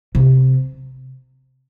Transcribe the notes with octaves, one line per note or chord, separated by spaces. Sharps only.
C3